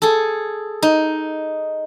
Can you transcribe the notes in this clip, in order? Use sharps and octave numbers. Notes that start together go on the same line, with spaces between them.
G#4 A4
D#4